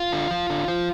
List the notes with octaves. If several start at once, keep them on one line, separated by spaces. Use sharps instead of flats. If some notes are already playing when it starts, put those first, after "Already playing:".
Already playing: F4
D3
F3
D3
F3